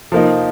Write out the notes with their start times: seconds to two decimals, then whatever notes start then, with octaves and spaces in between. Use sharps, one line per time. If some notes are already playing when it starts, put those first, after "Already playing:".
0.12 F3 A#3 D#4